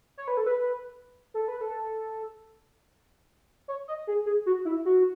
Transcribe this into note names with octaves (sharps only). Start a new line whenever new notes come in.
C#5
B4
A4
B4
A4
B4
A4
C#5
D#5
G#4
G#4
F#4
E4
F#4